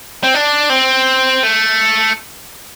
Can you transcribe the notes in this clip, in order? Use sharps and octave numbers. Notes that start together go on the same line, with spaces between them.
C4
D4
C4
A3